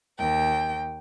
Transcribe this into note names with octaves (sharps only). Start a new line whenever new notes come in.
D#2 G5